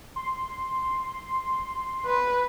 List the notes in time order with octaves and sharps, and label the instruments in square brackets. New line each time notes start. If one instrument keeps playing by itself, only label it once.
[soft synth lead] C6
[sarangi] B4